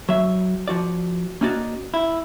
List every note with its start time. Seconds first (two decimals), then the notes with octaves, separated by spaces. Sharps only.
0.09 F#3 E5
0.68 F3 F#4 D5
1.41 A#3 C#4 D#4 F#4 D5
1.94 E4